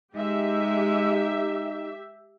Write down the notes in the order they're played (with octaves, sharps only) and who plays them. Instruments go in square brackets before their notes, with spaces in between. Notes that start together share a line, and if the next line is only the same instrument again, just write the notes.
[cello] G#3 [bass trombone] D#4 [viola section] G4 E5